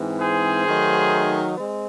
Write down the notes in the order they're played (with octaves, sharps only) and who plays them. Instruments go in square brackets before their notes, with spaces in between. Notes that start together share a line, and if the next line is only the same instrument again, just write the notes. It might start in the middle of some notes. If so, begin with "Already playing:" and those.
Already playing: [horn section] G#2 E3 C4
G#4 C5
D#3 F#3 A3 D#4
G#3 C4